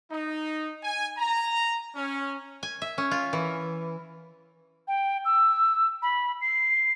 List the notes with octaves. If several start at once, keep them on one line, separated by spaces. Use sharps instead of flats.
D#4
G#5
A#5
C#4
G#5
E5
C#4
F4
E3
G5
E6
B5
C7